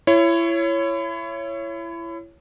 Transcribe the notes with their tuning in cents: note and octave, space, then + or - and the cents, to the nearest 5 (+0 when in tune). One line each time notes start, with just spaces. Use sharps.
E4 +30 C#5 +0